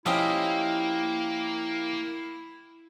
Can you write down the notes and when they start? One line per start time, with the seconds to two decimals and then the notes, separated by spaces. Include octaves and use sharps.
0.06 F3 A#3 C#4 E4 G4 D#5 E5